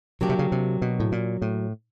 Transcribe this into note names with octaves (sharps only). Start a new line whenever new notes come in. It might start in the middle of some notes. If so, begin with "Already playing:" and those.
C#3 F#3 A#3 D4 G4
C3
C#3
C3
B2
A2
A#2
A2